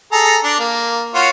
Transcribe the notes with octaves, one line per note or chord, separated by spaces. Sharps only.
G#4 A4 A#5
D4
A#3
F4 F#4 C#5